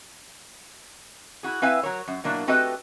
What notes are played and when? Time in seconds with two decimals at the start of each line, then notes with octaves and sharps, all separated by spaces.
1.43 E4 F#4 G#4
1.62 C4 E4 B4 E5 F5 G#5
1.83 F#3 A#4 C#5
2.08 F#2
2.24 B2 F#3 A#3 D4 E4
2.47 A3 C4 F#4 G4 B4 D#5